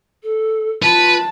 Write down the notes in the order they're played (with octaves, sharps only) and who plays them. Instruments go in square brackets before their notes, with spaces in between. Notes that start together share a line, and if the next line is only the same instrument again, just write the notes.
[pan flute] A4
[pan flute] F4 [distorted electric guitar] B4 [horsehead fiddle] A5